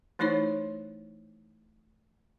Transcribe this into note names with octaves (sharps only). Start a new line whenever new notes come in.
E3 A3 D#4 E4 C5 C#5